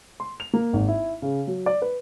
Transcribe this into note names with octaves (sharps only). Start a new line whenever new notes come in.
C6
F7
A#3
G#1
E4
C#3
F#3
D5
B4